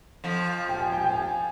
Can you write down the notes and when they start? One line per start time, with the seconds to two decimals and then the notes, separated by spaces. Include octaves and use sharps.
0.24 F2 F3
0.69 G5
0.81 G#5
0.92 G5
1.04 G5
1.15 G#5